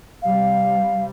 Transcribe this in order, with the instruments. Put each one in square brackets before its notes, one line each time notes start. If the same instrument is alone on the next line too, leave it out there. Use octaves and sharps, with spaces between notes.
[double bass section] C3 G3 [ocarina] F5